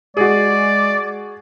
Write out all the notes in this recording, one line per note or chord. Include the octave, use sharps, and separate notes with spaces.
G#3 F#4 G#4 D5